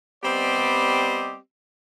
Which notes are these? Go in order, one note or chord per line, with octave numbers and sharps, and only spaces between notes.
G3 B3 C4 G4 D5 D#5